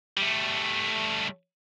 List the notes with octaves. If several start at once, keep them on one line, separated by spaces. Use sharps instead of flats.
G3 A3